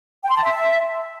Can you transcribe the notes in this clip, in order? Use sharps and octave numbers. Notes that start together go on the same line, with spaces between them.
G5
C6
A5
E5